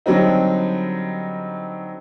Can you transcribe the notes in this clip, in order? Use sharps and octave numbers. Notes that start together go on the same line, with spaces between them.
D3 F#3 G3 C4 D#4